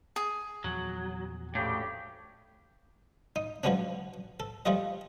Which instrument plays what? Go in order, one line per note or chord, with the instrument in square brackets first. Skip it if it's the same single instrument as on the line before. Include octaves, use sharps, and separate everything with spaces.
[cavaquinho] G#4
[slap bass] E2 A#2 F3 [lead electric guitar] F#3
[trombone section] D2 C#3 G4 [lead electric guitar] A2
[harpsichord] D#4
F3 F#3 G#3 B3 C#4 D4
A4
F3 G3 A3 F4 D#5